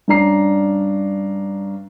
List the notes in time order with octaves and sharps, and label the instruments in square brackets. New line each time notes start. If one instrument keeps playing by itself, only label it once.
[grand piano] G2 C#4 D4 A#5 C7